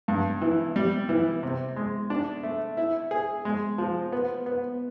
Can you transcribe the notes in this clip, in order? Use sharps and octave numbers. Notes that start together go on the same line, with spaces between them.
G2
E3
G3
E3
C3
G#3
D4
A3
E4
G#4
G#3
F3
B3
B3